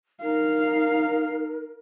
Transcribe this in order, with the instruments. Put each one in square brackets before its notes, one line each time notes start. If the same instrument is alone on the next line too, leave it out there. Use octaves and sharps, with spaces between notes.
[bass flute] D#4 [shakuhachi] A#4 [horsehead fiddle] F5